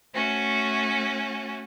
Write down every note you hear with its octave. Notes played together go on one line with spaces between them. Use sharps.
A3 C#4 F#4